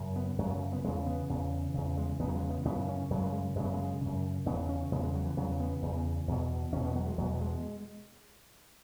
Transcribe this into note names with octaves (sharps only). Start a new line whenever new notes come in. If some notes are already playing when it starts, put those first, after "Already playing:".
Already playing: F#2 C#3
B3
F#2 C#3 F#3
F#3
B3
E2 C#3 G#3
B3
E2 C#3
E2 C#3
G#3
E2 C#3 F#3 B3
G#3
B3
F#2 C#3 B3
C#4
F#2 C#3 F#3
G#3
G#3
F#2 C#3 G#3
B3
G#3
F#2 C#3
E2 C#3 B3
C#4
E2 C#3 B3
G#3
F#3
E3
E2 C#3 F#3
B3
E2 C#3
E2 B2
E2 B2 C#4
B3
F#3
G#3
E2 B2 F#3
G#3